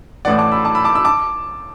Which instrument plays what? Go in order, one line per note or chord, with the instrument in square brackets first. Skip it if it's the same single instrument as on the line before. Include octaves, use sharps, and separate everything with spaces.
[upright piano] A1 A2 E3 D5 F#5
A5 D6
B5 E6
A5 D6
B5 E6
A5 D6
B5 E6
A5 D6